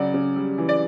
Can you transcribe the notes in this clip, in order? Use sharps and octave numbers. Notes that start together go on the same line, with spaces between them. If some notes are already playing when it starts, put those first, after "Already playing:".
Already playing: C#3 F#3 D5
C#3
G3
E3
D5